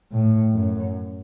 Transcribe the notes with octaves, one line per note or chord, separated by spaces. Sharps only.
A2
F#2